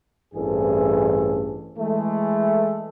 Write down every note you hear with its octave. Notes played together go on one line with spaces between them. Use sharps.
A1 G2 E3 C4 G#4 A4
E3 G#3 A3